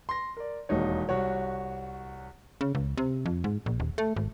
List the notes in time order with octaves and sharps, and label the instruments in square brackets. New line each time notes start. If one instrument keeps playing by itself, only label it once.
[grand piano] C6 A#6
A#4 D5
E1 D#2 D#4 C#5
C2 F#4 C#5
[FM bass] C#3
C#2
C3
F2
G#2
A#1
D#1
A3
G#1